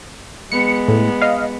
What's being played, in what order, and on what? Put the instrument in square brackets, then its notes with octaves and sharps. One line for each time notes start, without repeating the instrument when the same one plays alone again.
[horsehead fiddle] G#3 B3 [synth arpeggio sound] C#7
[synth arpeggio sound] A2
D#5 F5